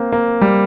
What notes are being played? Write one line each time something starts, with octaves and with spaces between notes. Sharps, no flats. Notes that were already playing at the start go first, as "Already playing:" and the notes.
Already playing: A#3 C4
A#3
G3